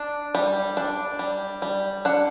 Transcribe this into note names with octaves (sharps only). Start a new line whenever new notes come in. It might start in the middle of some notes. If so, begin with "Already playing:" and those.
Already playing: D4
G3
D4
G3
G3
D4 F#5